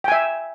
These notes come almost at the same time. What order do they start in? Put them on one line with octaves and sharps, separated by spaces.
G5 G#5 E5